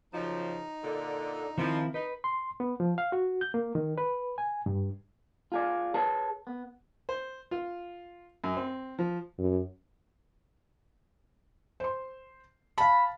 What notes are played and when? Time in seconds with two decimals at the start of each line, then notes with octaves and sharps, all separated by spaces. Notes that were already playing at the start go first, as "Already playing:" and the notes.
0.13 F#2 C#3 F3 D#4
0.83 A#2 D3
1.58 D#3 F3 C4 E4
1.94 D#4 B4
2.24 C6
2.60 B3
2.80 F3
2.98 F5
3.12 F#4
3.41 G6
3.54 A#3
3.75 D#3
3.98 B4
4.38 G#5
4.66 G2
5.52 F4 G#4 D5
5.94 G#4 B4 C#5 A5
6.47 B3
7.09 C5
7.51 F4
8.44 F#2
8.57 C4
8.99 F3
9.38 F#2
11.80 C5 C6
12.78 F5 A5 B5